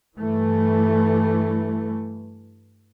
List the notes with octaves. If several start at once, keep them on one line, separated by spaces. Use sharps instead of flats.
G2 E3 A3